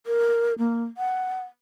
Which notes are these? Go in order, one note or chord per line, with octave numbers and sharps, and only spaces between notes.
A#4
A#3
F#5